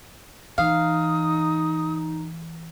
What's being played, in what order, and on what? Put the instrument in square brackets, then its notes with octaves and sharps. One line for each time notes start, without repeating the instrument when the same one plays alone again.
[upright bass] E3 [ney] D#4 [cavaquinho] F5 [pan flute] D#6